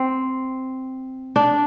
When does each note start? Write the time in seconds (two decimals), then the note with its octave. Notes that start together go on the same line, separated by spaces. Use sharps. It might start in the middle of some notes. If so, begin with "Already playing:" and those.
Already playing: C4
1.36 D4